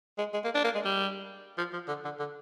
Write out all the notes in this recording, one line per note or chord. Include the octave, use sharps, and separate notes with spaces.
G#3
G#3
A#3
D4
A#3
G#3
G3
F3
F3
D3
D3
D3